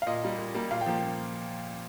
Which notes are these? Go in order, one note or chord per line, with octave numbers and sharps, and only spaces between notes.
F5
A#2 D#5
G3 A#3
A#2
G3 A#3
A#2 F5
G5
F3 A#3